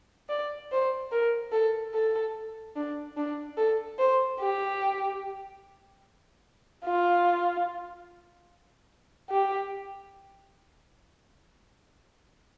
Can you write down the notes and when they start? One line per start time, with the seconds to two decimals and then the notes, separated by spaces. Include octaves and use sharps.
0.29 D5
0.71 C5
1.12 A#4
1.52 A4
1.94 A4
2.76 D4
3.17 D4
3.57 A4
3.98 C5
4.39 G4
6.85 F4
9.30 G4